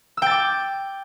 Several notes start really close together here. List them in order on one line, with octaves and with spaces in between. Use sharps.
E6 G5 A6 D6